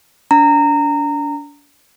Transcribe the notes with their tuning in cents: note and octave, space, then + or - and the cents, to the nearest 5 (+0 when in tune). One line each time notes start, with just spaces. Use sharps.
D4 -35 A#5 -20